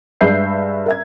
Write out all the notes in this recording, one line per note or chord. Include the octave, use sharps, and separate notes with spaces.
G2 G#3 B4 E5 G6 C7
A#4 E5 G#6